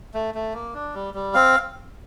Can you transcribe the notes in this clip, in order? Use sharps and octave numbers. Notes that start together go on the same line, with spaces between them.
A3
A3
A#3
D4
G3
G3
C4 F5